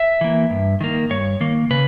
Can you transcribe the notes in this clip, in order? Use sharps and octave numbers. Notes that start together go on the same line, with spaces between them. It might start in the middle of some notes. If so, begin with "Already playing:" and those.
Already playing: E5
E3 A#3
G2
D#3 A#3
G2 C#5
D#3 A#3
C#3 B4